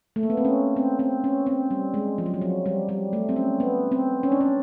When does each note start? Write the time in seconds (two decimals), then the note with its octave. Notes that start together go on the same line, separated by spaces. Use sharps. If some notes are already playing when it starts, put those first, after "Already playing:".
0.16 A3
0.23 A#3
0.30 B3
0.37 C4
0.45 C#4
0.76 C4
0.99 C4
1.24 C#4
1.47 C4
1.71 G3
1.94 G#3
2.18 F3
2.26 F#3
2.34 F3
2.41 F#3
2.66 G3
2.89 G3
3.13 A3
3.29 C4
3.36 C#4
3.60 B3
3.92 C4
4.23 C#4
4.32 D4
4.41 C#4